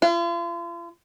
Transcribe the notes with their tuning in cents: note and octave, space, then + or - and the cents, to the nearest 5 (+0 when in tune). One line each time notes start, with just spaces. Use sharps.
F4 -40